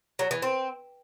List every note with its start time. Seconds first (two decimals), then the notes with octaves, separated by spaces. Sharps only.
0.19 F#3
0.31 E3
0.42 C4